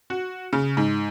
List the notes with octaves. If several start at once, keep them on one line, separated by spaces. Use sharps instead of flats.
F#4
C#3
G#2